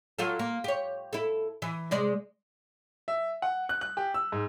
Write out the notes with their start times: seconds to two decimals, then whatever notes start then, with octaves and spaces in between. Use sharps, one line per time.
0.19 F#3 F4 A4
0.39 A#3
0.64 G4 C#5
1.13 E4 A4
1.62 E3
1.91 C3 G#3 D5
3.08 E5
3.42 F#5
3.69 F#6
3.81 F#6
3.97 G4
4.14 E6
4.32 G#2